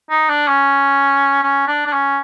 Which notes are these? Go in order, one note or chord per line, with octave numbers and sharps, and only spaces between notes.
D#4
D4
C#4
C#4
D4
D4
C#4